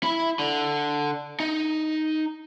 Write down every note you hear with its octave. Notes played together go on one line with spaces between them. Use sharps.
E4 B5
D3
D#4